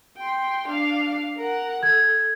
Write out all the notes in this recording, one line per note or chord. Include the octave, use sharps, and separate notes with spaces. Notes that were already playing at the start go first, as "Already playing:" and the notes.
G5 C6
D4 F5
A#4 F#5
A4 G#6